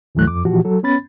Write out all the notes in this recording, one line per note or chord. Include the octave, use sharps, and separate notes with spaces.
D2 G#2 E3 F#3 A3 F#6
F2 D6
A#2 E3 F3 F#4 G4
F#3 A4
B3 C#4 B5 A6